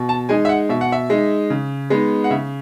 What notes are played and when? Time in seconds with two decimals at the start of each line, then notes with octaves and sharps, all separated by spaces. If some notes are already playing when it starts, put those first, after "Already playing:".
Already playing: B2
0.09 A5
0.29 G#3 D#4 G#5
0.45 E5
0.49 F#5
0.69 B2 E5
0.81 F#5
0.92 E5
1.10 G#3 D#4
1.50 C#3
1.90 G#3 B3 D#4
2.24 F#5
2.30 C#3 E5